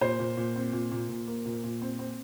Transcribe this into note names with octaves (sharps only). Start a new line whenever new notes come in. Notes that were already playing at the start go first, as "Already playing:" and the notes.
A#2 C5
A#2
A#2
C4
A#2
A#2
A#2
A#3
A#2
A#2
C4
C4